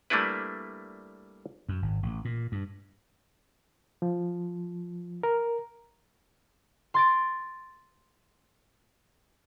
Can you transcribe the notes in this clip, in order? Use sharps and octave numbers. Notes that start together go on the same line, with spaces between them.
G3 A3 A#3 D4 E4 B4
F#2
G#1
A1
A#2
G2
F3
A#4
C6 A6 D7